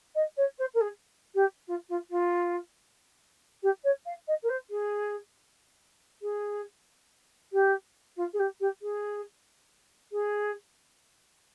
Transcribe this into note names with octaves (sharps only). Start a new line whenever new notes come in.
D#5
C#5
C5
A#4
G#4
G4
F4
F4
F4
G4
C#5
F5
D#5
A#4
C5
G#4
G#4
G4
F4
G#4
G4
G4
G#4
G#4